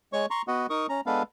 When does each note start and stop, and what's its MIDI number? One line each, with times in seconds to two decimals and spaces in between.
0.13 0.26 56
0.13 0.26 73
0.13 0.26 85
0.30 0.42 82
0.30 0.42 84
0.30 0.42 85
0.48 0.67 59
0.48 0.67 66
0.48 0.67 75
0.48 0.67 78
0.70 0.87 63
0.70 0.87 70
0.70 0.87 85
0.70 0.87 87
0.89 1.01 61
0.89 1.01 82
1.06 1.23 56
1.06 1.23 59
1.06 1.23 62
1.06 1.23 69
1.06 1.23 71
1.06 1.23 77